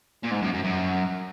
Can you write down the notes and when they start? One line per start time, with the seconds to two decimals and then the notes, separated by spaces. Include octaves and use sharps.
0.24 A#2
0.31 G#2
0.42 F#2
0.54 F#2
0.64 F#2